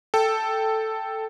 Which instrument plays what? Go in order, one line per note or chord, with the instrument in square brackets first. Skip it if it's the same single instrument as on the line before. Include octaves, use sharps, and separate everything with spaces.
[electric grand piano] A4 G5